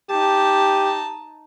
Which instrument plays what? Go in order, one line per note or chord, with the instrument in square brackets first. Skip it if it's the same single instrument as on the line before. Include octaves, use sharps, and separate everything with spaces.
[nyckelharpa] D#4 A5 [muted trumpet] G4